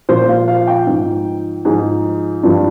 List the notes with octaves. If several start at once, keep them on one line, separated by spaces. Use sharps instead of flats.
A#2 F3 C5
F5
F5
G5
G#2 F3
G#2 F3 G#4
G2 F3